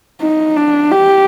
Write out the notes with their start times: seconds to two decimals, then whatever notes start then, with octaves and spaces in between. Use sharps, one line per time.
0.22 D#4
0.57 D4
0.92 G4